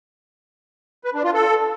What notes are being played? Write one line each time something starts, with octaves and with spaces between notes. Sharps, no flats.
B4
D4
F4
A4